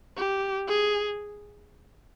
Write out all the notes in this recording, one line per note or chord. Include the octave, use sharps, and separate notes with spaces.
G4
G#4